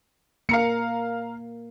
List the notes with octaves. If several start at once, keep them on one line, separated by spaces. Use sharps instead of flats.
A#3 F5 A#5 C#7